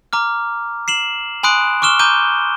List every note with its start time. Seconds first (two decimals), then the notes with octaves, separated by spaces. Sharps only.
0.13 A#5 D6 F6
0.88 C7 E7 F#7
1.43 G#5 B5 C6 D#6 F#6 D7
1.82 C#6 D6 F6 E7 G7
1.99 A#5 D6 G6 D#7 G7